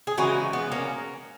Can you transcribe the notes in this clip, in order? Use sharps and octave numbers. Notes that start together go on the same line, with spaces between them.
G#4
C#3 E3 G#3 D#4 F#4
B3
A#3 C#4